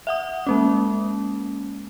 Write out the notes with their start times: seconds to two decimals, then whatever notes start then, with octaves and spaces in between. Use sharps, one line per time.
0.07 E5 F#5 D#6
0.47 G#3 A#3 C#4